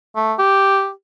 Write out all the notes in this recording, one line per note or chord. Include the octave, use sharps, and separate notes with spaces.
A3
G4